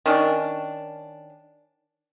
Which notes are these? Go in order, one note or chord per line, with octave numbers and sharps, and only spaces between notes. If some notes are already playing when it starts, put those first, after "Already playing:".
D#3 C#4 D4